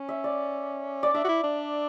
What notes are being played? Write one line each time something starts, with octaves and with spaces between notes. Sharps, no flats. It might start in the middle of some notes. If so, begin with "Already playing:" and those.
Already playing: C#4
E5
D5
D5
D4 E5
F#4
E4
D4